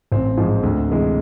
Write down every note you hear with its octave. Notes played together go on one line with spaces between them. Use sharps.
A1 C4
G#2 F3 G#3
D2
C3 E3 G#3